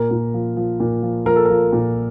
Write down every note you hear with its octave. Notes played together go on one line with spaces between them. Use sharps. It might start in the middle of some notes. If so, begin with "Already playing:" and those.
Already playing: A#2 A#4
A#2
F3
F3
A#2
F3
F3 A#4
A4
F3 A#4
A#2